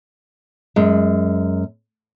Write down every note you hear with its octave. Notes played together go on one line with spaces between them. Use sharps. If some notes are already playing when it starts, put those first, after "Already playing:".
F#2 G#3